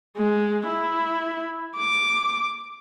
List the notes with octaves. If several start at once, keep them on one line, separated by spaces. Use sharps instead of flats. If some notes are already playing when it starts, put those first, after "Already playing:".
G#3
E4
D6